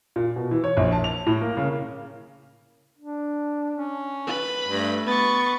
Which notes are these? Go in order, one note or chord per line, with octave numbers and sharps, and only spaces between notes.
A#2
B2
E3
C#5
A#1
A5
F7
A2
A#3
C#3
D4
C#4
B4 B5
G2 A3
B3 C#6 A6